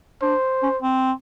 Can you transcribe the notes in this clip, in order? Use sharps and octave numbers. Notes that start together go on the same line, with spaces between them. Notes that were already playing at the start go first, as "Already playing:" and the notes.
D4 C5
C#4
C4